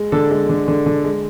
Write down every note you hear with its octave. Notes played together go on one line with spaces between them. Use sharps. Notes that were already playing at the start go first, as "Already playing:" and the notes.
Already playing: G#3
D3 A4
G#3 A4
D3
D3
D3
G#3